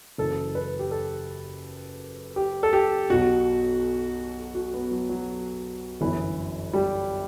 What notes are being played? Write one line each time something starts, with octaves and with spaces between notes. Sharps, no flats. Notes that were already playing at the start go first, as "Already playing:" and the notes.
F#1 F#2 E3 A4
B4
G4
A4
G4
A4
G4
B1 B2 F#4
F#4
B3
F#3
F#3
G1 F#2 E3
G3